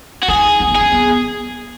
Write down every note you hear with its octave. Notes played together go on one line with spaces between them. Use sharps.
F#4
D#4 G#4
C#4
B3
C#4 G#4
B3